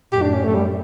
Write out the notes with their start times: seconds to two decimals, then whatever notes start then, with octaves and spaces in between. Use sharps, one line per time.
0.12 F#2 A2 G4
0.23 D4
0.33 C#4
0.44 F#2 A2 A3
0.55 G3